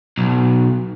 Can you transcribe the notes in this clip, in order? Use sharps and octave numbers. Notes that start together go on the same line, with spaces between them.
B1